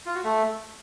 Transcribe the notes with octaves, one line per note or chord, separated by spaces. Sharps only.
F4
F#4
A3